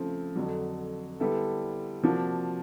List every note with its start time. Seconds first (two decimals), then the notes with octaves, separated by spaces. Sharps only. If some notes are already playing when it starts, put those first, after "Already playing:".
Already playing: C#3 F3 A3 C4
0.35 F2 D3 F#3
1.20 D3 G3 B3 E4 A4
2.03 C3 F3 A#3 D4 F#4